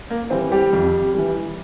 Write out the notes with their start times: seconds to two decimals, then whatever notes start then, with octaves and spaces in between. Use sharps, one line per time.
0.10 A#3
0.30 E3 G3 C4
0.52 G3 G4
0.73 F2
1.14 E3 G3